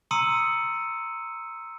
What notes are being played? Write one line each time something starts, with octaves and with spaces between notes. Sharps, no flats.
A#5 C6 D#6 E6 C#7 D#7